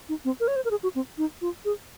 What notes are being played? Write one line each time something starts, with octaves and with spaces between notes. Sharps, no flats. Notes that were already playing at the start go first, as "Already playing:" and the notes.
D#4
C4
A#4
C#5
C5
A#4
G#4
F#4
C4
D#4
F4
G#4